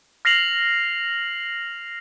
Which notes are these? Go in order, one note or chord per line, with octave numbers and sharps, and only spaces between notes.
F6 A#6 C7 F7 F#7